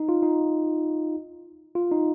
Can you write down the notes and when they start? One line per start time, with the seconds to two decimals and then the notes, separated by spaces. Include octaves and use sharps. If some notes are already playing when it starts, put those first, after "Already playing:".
Already playing: D#4
0.09 F4
0.23 D#4
1.75 F4
1.92 D#4